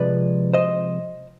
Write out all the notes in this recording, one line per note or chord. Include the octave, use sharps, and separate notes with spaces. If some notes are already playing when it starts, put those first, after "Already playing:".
Already playing: C3 F3 G#3 B4 D5
C5 D#5